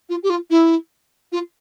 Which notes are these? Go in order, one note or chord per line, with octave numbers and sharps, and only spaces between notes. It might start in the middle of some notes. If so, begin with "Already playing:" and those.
F4
G4
F4
E4
F4